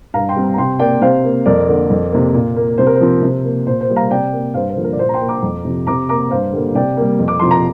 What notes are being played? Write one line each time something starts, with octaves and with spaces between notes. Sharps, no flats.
G2 F5 A#5
G5 C6
G3 C4
A#5
C3 G5 C6
A#3 D5 G5
C3 C5 F5
A#3
F2 A#4 D5
D3 A#3
F2
C3 A#3
A#2
A#3
C3 C5
A#4
C5
F3 C4
C3
A#3
A#2 C5
C5
G3 A#3
F5 A#5
C3 D5 G5
A#3
G2 C5 F5
C5
D3 F3 A#3
A#4
D5
A#2 C5
A#5
G5 C6
A#3
A#5 D6
F2
C3 F3
C3 A#5 D6
A#3 A#5 D6
G2 C5 F5
D3 G3 A#3
C3 D5 G5
G3 A#3
F2
D6
C3 F3 C6
A#5